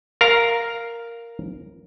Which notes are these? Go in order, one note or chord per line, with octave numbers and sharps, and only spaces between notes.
A#4 F5 A#5